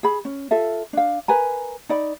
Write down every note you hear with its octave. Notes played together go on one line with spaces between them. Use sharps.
G#4 B5
C#4
F4 A4 E5
D4 F5
A#4 B4 G#5 A#5
D#4 D5 B5